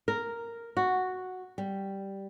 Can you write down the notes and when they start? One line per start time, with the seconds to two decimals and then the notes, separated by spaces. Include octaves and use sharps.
0.08 A#4
0.77 F#4
1.58 G3